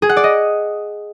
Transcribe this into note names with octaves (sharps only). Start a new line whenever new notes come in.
G#4
F#5
D5
D#5